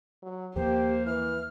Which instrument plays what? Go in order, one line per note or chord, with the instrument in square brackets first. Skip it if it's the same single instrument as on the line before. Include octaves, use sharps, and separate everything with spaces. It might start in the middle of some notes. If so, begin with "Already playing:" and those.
[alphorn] F#3
[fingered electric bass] D#2 F3 [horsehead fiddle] A#3 [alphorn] G4 [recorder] C5
[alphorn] E3 [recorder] F6